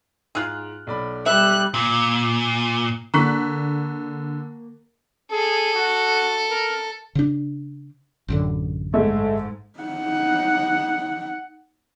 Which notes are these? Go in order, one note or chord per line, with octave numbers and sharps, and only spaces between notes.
G#2 F4 G#4 F6 F#6
B1 D5 B5
G3 E5 F#6
A#2
D3 A#3 A#5 C#6 F#6 B6
G#4 A4
F#4
A#4
C#3 D4
A1 F#2 D3
G#2 G#3 A3
D#4 F#5